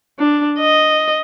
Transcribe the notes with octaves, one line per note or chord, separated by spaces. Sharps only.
D4
D#5